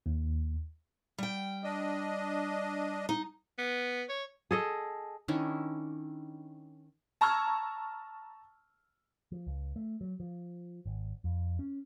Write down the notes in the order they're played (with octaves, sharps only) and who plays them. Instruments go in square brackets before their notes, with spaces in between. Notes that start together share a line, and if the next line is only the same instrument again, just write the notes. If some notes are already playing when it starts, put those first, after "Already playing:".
[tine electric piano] D#2
[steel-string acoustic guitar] G3 G5
[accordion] D4 D#5
[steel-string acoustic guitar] D#4
[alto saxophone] B3
C#5
[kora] G#4 A4 D#5
[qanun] D#3 C#4 D4 E4
[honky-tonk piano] A5 A#5 C#6 E6 F6 G#6
[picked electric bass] F3
C#2
A3
F#3
F3
G#1
F2
C#4